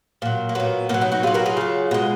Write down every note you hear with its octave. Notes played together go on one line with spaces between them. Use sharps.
A#2 F#3
A#3
A#2 F#3 B3
B2 F#3 A#3 C#4
B3 D#4
D#4 F#4
B2 F#3 F4 G#4
F#4 A#4
F4 G#4
C#3 F#3
B2 G#3